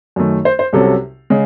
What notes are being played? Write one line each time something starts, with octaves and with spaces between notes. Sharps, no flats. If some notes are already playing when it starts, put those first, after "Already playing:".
F#2 D#3 A3
C5
C5
C2 C3 F#3 C#4 A4
C#3 G#3